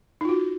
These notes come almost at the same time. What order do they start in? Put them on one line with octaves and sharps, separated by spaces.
D#4 F4 F#4